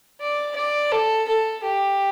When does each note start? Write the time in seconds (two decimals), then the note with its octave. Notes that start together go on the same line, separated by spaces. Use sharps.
0.21 D5
0.56 D5
0.92 A4
1.28 A4
1.64 G4